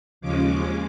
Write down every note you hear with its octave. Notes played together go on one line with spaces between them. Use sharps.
D#2 C#3 F3 G#3 C#4 D6